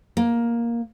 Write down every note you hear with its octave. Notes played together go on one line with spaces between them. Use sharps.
A#3